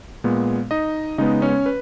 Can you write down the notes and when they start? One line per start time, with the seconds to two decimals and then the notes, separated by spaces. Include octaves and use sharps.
0.24 A#2 G#3 B3
0.71 D#4 D#5
1.18 C#3 G#3 B3 D#4 D#5
1.42 C#4 C#5
1.66 B4